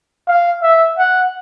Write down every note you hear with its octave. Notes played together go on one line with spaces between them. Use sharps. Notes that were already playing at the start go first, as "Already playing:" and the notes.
F5
E5
F#5